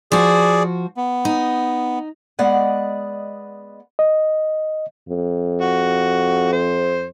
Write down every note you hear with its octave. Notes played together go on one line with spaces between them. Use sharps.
F3 F#4 G#4 D5
B3
D#4
G#3 B3 D5 D#5 F#5
D#5
F2
F#4
C5